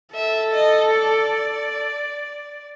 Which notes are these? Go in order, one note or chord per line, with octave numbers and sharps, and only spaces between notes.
A4 E5
D#5
D5